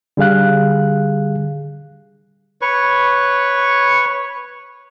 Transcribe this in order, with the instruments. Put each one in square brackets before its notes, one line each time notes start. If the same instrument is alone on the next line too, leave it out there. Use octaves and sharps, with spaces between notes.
[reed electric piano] D3 G3 G#4 F5 F#6
[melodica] B4 C#5 C#6